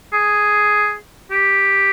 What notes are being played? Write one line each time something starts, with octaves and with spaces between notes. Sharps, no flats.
G#4
G4